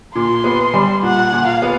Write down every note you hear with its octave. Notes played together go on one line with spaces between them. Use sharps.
A#2 C6
B3
G3
A#2 F#5
A#2
F5
B3